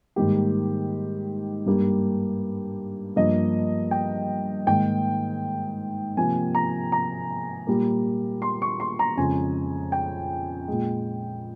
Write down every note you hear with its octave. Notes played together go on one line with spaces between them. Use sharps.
G#2 D#3 G3 A#3 G4
G2 G3 A#3
G2 F3 A#3 D#5
G5
G#2 D#3 A#3 G5
C3 F3 A#3 G#5
A#5
A#5
A#2 G3 A#3
C6
C#6
C6
A#5
F2 C#3 G#3 G#5
G5
A#2 G#3